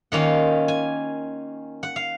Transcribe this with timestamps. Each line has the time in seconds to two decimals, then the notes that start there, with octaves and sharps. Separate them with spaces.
0.12 D#3 A#3 C#4 F4 F#5
0.68 G#5
1.83 F#5
1.96 F5